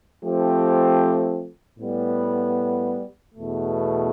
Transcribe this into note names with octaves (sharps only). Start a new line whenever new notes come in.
F3 A3 C4 G4
A2 G3 B3
E2 B2 A3